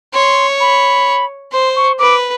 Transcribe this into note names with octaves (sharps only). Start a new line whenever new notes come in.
C#5 C6
B5
C5 C6
C#6
B4 D6